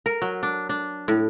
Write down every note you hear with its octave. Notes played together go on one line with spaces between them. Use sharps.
A#4
F#3
D4
D4
A2